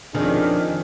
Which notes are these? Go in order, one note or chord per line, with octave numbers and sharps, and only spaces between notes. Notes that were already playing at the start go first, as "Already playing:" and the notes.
F2 D#3 C#4 D4 G#4